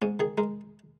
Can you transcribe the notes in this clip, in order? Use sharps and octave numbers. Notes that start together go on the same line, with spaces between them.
G#2 C#4
D#3 G#4
G#3 A#4